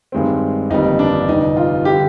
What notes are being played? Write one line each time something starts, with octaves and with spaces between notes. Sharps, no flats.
G2 D#3 G#3 C4
G1 F2 D#3 G3 A#3 D#4
D4
G1 F2 C3 D#4
F4
D3 G3 G4